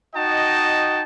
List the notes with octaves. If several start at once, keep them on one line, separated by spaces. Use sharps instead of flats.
D#4 F#4 D#5 G5 A5